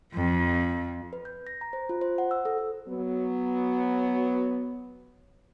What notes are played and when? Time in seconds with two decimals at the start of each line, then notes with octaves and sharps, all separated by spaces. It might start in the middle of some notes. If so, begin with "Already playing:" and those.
0.15 F2 F3
1.13 B4
1.25 G6
1.47 A#6
1.61 A#5
1.73 C5
1.89 F4
2.01 C5
2.18 F#5
2.31 E6
2.45 A4
2.58 A4
2.88 F#3 B3